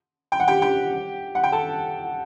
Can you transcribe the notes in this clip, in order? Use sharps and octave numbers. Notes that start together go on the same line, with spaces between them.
G5
F#5
G4 G5
G4 G5
F#5
G5
A4 A5